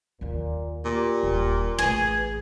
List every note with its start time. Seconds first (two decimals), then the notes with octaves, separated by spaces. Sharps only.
0.21 D#2 A#2 D#3
0.85 A#2 G4
1.23 D#1
1.79 A1 A2 G#4 B4